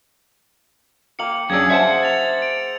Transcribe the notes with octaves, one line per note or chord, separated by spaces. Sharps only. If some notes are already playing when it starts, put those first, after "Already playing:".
A#3 F5 G5 C#7 F#7
F#2 C#4 D4 G#4 E6 G#6
C5 E5 F#5 A5
A6 F7
D7